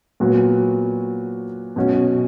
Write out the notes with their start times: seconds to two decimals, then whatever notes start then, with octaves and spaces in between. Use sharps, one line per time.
0.20 A#2 F#3 B3 F#4
1.76 B2 F#3 C#4 F#4